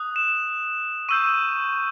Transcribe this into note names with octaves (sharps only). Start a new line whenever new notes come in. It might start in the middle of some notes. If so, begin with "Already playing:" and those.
Already playing: D#6 F#6
E7
C#6 E6 G6 D#7